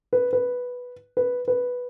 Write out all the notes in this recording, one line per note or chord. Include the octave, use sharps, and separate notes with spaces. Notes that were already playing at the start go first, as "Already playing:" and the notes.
B4
B4
B4
B4